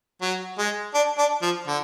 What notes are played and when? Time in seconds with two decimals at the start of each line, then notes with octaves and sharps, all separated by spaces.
0.22 F#3
0.58 G#3
0.94 D4
1.18 D4
1.42 F3
1.67 D3